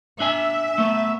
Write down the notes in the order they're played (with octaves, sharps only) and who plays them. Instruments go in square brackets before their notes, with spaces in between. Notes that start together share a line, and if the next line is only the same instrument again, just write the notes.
[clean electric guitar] D4 G#5 [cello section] E5
[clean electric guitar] A3 B3